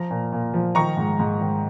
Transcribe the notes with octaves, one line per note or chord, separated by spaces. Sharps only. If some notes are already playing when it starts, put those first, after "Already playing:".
Already playing: F3 A#5
A#2
A#2
F3
D#3 A#5 C#6
G#2
G#2
D#3